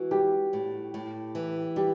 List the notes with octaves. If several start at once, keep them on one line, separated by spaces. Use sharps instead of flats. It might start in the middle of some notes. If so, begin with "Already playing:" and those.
Already playing: E3 F#4
G3 G4
A2
A2
E3
G3 G4